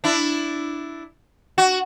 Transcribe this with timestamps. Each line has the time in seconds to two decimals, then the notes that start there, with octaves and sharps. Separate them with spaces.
0.04 D4 E4
1.58 F#4